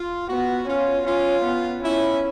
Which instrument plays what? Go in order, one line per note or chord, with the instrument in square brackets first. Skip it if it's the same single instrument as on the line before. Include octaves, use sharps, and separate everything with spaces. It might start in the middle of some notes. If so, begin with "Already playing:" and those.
Already playing: [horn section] F4
[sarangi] B3 [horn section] F#4
[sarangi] C#4 [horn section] F4
[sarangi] C#4 [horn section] F4
[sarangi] B3
[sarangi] C#4 [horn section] E4